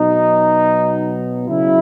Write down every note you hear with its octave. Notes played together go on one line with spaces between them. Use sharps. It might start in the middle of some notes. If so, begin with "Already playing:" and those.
Already playing: B2 F#3 D#4
C#3 F#3 E4